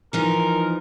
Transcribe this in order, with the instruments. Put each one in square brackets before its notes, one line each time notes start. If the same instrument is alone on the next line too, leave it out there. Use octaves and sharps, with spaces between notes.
[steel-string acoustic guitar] E3 F3 D#4 [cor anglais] A#4